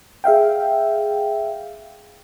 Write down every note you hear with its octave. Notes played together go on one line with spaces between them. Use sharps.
G#4 E5 F5 G5